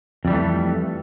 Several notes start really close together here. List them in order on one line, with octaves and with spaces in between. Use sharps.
F2 G3 E3 A3